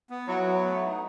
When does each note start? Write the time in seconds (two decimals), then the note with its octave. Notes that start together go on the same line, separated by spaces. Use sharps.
0.10 B3
0.27 F#3 E4
0.46 B3
0.65 A3
0.83 D#4